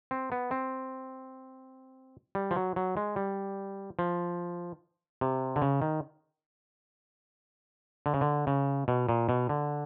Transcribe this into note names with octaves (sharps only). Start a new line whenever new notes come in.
C4
B3
C4
G3
F3
F#3
F#3
G#3
G3
F3
C3
D3
C#3
D#3
D3
C#3
D3
C#3
B2
A#2
B2
D3